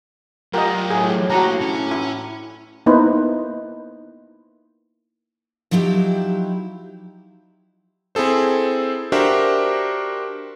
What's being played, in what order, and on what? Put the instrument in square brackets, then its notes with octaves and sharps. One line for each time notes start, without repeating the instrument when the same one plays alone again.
[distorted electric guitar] F#3 D5 [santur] F4 G4 F#5 [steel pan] A#4 D#5
[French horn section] A2 [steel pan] G#4
[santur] F#3 D4 [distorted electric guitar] A#3 B5 [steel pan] F#4 A#5
[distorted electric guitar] C#4
[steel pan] E4
A#3 B3 D#4 E4 B4 C5
[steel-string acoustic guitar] F3 F#3 D#4 E4 G4
[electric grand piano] C4 E4 G#4 A4 C5
D4 F#4 G4 A#4 C5 E5